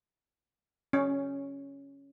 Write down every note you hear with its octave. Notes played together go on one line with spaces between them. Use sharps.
C#4